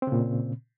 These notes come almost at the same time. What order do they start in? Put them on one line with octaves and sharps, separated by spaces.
C4 C#3 A#2